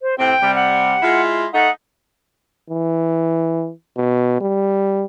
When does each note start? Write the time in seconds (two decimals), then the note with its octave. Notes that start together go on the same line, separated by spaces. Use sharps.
0.01 C5
0.18 A2 C3 C4 G5
0.42 C3 G3
0.55 F#5
1.02 G#3 E4 F4
1.54 A3 D#4 F#5
2.70 E3
3.97 B2
4.41 G3